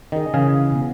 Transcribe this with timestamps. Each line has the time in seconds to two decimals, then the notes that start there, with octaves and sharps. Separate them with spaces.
0.12 D#3 G#4 D#5
0.34 C#3 E3 G#4 F5
0.72 B2 B3